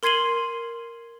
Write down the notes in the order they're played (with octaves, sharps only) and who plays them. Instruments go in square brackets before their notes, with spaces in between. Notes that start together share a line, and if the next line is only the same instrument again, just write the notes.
[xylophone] A#4 C6 G#6 C7 D#7 F#7